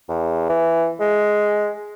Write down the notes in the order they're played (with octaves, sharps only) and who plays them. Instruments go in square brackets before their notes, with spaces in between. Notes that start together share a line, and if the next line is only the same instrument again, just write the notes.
[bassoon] E2
E3
G#3